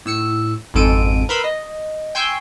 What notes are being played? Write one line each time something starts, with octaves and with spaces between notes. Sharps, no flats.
A2 E6 C#7
G#1 F2 G#2 A4 D7 D#7
A#4 B4 B5 C6 E6
D#5
G5 G#5 C6 C#6 E6 G6